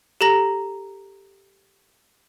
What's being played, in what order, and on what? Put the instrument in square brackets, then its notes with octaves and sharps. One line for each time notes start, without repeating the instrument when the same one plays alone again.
[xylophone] G4 A4 A#5 A#6